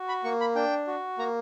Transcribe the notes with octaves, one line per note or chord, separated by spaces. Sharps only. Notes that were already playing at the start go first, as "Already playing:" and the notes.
Already playing: F#4
B5
A#3 C#6
B5
D4 G5
F#4
A#3 A#5